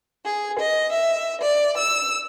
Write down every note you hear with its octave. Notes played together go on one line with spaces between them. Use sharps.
G#4
D#5
E5
D5
E6